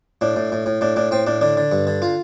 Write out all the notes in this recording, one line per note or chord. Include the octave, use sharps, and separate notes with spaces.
A2 D4
A2
A2
A2
A2 D4
A2 D4
A2 C4
A2 D4
D3 D4
D3
G2
D3
F4